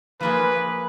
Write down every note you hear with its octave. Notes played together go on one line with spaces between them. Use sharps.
F3 A#3 F4 G#4 B4